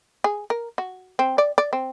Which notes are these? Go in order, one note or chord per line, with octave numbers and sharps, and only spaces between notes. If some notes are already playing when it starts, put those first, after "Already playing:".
G#4
A#4
F#4
C4
D5
D5
C4